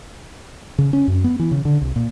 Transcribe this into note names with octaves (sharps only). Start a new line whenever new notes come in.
C#3
C#4
F#2
B3
E3
C#3
D3
C2
A#2